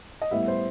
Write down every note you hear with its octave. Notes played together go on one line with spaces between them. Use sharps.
D#5
A2 G3 B3 E5
C5